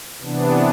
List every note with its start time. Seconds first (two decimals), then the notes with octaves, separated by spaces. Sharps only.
0.21 C3 E3 B3 D4